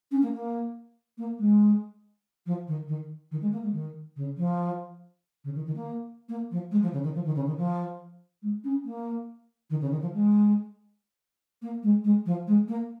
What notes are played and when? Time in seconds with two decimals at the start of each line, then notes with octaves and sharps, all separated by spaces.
0.11 C#4
0.22 A#3
0.33 A#3
1.18 A#3
1.39 G#3
2.46 F3
2.67 D#3
2.88 D#3
3.31 D#3
3.41 G#3
3.52 A#3
3.63 G#3
3.73 D#3
4.16 C#3
4.37 F3
5.44 C#3
5.55 D#3
5.66 D#3
5.76 A#3
6.29 A#3
6.51 F3
6.71 G#3
6.82 F3
6.93 C#3
7.03 D#3
7.15 F3
7.25 D#3
7.35 C#3
7.46 D#3
7.57 F3
8.42 G#3
8.64 C#4
8.85 A#3
9.70 D#3
9.81 C#3
9.91 D#3
10.01 F3
10.13 G#3
11.62 A#3
11.83 G#3
12.04 G#3
12.26 F3
12.47 G#3
12.68 A#3